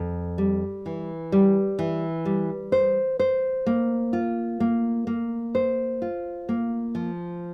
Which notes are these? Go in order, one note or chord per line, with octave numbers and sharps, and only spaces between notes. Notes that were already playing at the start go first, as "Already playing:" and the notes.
Already playing: F2
G3
E3
G3
E3
G3
C5
C5
A#3
F4
A#3
A#3
C5
F4
A#3
F3